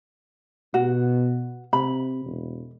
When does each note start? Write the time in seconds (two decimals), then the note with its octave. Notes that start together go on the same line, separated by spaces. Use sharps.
0.74 B2 F#4
1.73 C3 B5
2.25 E1